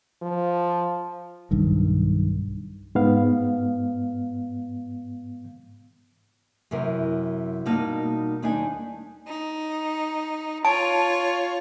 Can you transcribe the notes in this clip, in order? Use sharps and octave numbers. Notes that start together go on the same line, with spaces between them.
F3
B1 G2 D#3
G#2 B3 F5
F#2 C3 E3 A#4
B2 G3 A#3 D#4 F5 A5
D#2 G3 D4 D#4 D5 G#5
D#4
F4 C#5 A5